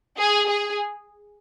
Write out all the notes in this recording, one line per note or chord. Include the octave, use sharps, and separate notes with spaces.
G#4
G#4